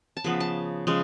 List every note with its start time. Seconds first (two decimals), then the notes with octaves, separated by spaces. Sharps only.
0.17 A5
0.24 C#3 F3 B3 B5
0.40 A5
0.87 C#3 F3 G#3